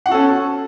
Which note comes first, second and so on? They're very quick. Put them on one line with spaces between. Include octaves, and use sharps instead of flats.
F#5 F#4 A4 C#4